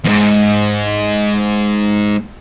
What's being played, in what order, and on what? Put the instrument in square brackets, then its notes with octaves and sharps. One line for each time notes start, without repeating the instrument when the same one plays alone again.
[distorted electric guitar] E2 G#2